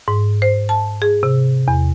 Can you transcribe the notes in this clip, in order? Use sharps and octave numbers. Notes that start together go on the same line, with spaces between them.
G#2
C5
A5
G#4
C3
E2